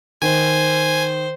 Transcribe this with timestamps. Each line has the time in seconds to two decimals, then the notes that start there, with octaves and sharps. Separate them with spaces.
0.22 D#3 C5 G#5